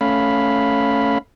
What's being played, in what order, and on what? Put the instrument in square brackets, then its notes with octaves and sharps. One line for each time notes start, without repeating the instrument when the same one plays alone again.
[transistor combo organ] A3 C#4 F5 B5